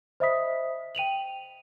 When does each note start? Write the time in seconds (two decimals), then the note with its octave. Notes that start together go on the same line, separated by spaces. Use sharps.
0.20 C5 D#5 E5 B5 D#6 B6
0.95 G5 D#7 F7 F#7